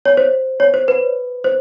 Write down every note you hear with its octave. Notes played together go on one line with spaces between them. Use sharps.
C#5
C5
C#5
C5
B4
C5